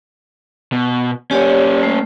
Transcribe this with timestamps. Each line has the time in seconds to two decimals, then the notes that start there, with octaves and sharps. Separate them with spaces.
0.73 B2
1.31 A#3 C#4 G4 C#5 D5
1.83 A3